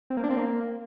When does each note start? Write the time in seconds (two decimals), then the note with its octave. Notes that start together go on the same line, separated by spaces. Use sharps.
0.10 C4
0.17 A#3
0.24 D4
0.30 C4
0.37 A#3